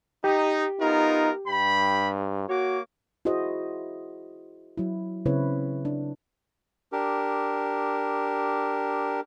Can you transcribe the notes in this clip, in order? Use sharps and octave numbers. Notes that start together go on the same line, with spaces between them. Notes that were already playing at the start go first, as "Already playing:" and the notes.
D#4 G4
B3 D#4 F4 A#4
G2 G5 B5
A#3 F#4 C#5 D6
E4 F#4 G#4 C5 D#5
F#3 E4
C#3 C4 E4 B4 C#5
D4
D4 G4 A#4